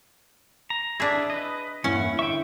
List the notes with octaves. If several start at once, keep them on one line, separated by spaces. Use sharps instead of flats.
A#5
D4 E4 G#4 E5
B4 D#5
E2 G2 A#3 C#4 E4 F#5
D3 E5 G5 C#6